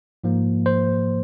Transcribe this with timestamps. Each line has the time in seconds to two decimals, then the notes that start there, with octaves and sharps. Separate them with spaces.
0.24 G#2 F3 A#3
0.66 C5